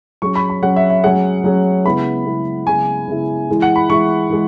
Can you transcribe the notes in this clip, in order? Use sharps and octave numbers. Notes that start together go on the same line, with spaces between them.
F#3 C#4 G#4 C#6
B5
B5
F#3 C#4 G#4 F#5
E5
E5
F#3 C#4 G#4 F#5
F#3 C#4 G#4
C#3 G#3 B3 E4 G#4 B5
C#3 G#3 B3 E4 G#4
C#3 G#3 B3 E4 G#4 G#5
C#3 G#3 B3 E4 G#4
E3 G#3 E4
F#5
B5
E3 G#3 E4 C#6
E3 G#3